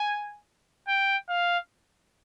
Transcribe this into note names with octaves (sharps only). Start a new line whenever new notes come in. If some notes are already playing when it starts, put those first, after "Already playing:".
Already playing: G#5
G5
F5